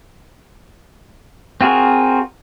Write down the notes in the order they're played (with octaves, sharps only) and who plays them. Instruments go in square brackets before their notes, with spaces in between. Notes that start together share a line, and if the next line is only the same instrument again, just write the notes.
[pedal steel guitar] C4 F4 F#4 G#4 A#4